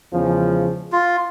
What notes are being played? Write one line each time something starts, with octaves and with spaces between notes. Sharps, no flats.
E2 C#3 F3 G#3
F4